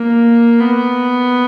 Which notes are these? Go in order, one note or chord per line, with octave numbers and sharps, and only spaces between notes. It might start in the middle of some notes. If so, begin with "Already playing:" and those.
Already playing: A#3
B3